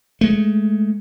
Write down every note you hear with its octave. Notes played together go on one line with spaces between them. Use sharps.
G#3 A3